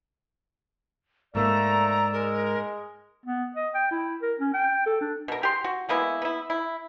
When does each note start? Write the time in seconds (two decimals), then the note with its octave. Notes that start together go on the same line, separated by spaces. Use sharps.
1.35 G#2 A3 A#3 D5 A#5 E6
2.13 G#3 A#4
3.26 B3
3.56 D#5
3.75 G5
3.91 E4
4.22 A#4
4.39 C#4
4.54 G5
4.86 A4
5.01 D4
5.28 B2 A#4
5.43 G4 C6
5.64 F#4
5.89 G#3 A#3 B3 E4
6.22 B3 E4
6.50 E4